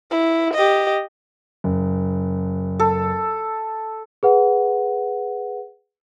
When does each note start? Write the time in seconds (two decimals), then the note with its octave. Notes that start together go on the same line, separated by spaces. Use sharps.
0.11 E4
0.54 G4 D#5
1.64 F#1
2.79 A4
4.23 G#4 B4 F#5